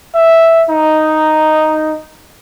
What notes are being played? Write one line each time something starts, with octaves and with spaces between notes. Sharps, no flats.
E5
D#4